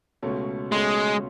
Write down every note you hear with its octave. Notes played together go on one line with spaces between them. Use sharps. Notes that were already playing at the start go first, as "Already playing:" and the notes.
C#2 B2 A3 C#4
C#2 B2 G#3 A3 C#4